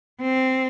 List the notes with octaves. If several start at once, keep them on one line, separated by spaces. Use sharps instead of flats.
C4